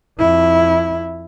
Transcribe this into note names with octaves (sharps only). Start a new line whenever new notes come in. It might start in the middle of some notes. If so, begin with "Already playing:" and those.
F2 E4